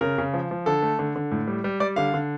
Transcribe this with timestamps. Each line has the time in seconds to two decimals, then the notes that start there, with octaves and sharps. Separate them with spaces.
0.01 C#3 A#4
0.18 C#3
0.34 F3
0.51 F3
0.66 D3 A4
0.82 A3
0.99 D3
1.16 D3
1.31 A2
1.47 G3
1.64 G3
1.80 G3 D5
1.96 D3 F5
2.14 D3